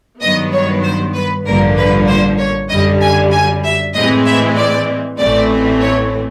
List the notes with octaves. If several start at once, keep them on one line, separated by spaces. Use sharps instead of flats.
G2 D#3 F#3 B3 D#5
C#5
C5
B4
A1 G2 D3 F3 A#3 A#4
B4
C5
C#5
F#2 D3 G3 D#5
G#5
G#5
E5
A2 E3 G#3 C4 D#5
E5
D5
A1 A2 E3 A3 C4 D5
C#5